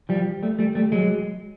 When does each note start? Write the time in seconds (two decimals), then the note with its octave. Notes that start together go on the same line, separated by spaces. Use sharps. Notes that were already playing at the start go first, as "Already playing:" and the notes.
0.09 F3 G3
0.43 G3 A3
0.59 G3 A3
0.75 G3 A3
0.92 F#3 G#3